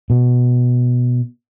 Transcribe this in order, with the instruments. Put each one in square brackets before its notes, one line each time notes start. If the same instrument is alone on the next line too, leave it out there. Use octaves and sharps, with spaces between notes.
[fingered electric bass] B2